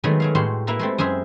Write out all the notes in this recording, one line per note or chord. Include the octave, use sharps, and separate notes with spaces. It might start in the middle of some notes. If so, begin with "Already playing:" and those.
D#3 F#3 G#3 A3 B3 G#4
F#3 G#4 F5
A2 G#3 F#4 G4 C6
A#3 E4 B4 E5 A#5
G#3 A3 C4
F#2 G#3 G#4 C5 E5